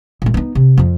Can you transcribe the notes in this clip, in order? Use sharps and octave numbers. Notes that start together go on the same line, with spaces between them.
A#2 A3
B3 D#4
C3
F2 F3